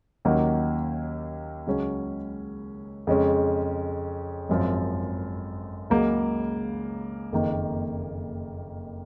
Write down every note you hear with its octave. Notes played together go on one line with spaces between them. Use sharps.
D#2 D#3 F#3 A#3 C#4
C#2 C#3 F#3 C#4
F2 C#3 G#3 C#4
G#1 F#2 F3
C#2 C#3 F#3 A#3
F#1 F2 D#3 A#3